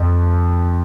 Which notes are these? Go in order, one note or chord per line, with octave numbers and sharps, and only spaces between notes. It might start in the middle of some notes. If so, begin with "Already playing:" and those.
Already playing: F2